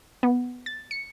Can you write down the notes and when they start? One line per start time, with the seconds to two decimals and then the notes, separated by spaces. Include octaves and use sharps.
0.23 B3
0.66 A6
0.91 C#7